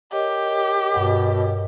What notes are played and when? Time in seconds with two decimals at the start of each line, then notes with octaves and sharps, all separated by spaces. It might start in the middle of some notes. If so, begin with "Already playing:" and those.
0.13 G4 A#4 C#5 D#5
0.94 G2 B2 F#5